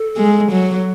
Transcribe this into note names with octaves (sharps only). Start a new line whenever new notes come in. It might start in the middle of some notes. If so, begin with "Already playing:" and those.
Already playing: A4
G#3
F#3